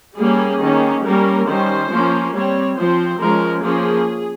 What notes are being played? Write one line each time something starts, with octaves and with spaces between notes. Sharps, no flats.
G3 A#3 C#4 G#4
D#3 A#3 C#4
G3 A#3 C#4 A#4
D#3 G3 C#4 C5
F3 A#3 C#4
G3 C4 C#5
F3 C4 C5
F3 G#3 C#4 A#4
F3 A#3 C#4 G#4